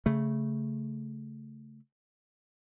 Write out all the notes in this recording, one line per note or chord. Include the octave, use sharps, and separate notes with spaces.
C#3 A3